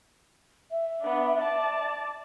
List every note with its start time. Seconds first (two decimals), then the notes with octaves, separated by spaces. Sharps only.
0.71 E5
1.01 B3 D4
1.37 D5 A5